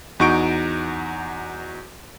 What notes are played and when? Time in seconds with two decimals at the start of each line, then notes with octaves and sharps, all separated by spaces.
0.20 E2 D#4 F#4 C#6 G6 D7